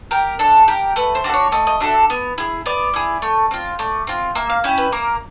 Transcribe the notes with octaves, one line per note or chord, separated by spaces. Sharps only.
G4 A#4
D4 A4
G4 A#4
A3 B4
C5
D4 F#4 A4
C#5
A3 D#5
D#5
D4 F#4 A4 E5
B3
E4 G#4
B3 D5
E4 G#4
A3
C4 F4
A3 D5
C4 F4
A#3 E5
F5
C#4 E4 G4
B4
A#3 A#4